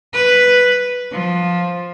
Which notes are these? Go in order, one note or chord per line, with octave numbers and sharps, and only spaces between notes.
B4
F3